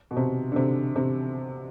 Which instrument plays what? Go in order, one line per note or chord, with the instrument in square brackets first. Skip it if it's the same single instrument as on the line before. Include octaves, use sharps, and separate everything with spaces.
[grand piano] B2
C3
D3
C3
C3